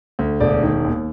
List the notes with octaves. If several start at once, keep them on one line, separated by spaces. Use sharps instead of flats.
D2
E1 D5
D#3
D#2